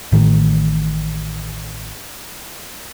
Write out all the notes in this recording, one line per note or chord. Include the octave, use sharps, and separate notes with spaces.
A1 A2 D#3